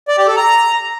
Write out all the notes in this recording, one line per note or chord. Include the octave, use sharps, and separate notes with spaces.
D5
G4
A4
A#5